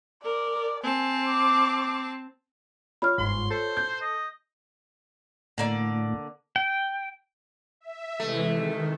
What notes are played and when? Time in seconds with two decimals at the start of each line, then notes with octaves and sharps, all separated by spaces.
0.24 A#4 D5
0.83 C4 G#5 A5
1.28 D6
3.02 F4 C#5 B5 F6
3.18 G1 G#2 C6
3.51 A4 C5
3.77 G6
4.01 D#5
5.58 A2 D3 A#3 D5
6.56 G5
7.81 E5
8.20 C3 E3 G#3 A3
8.53 D#3